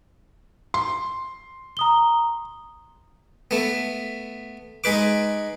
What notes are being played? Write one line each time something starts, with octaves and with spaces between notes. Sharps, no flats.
C6
A#5 D#6 G7
A3 B3
G#3 D#4 B4 D6